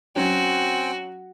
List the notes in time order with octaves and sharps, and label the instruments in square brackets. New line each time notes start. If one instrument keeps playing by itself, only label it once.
[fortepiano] F#3 C#4 [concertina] C4 G5 G#5 [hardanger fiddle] F#4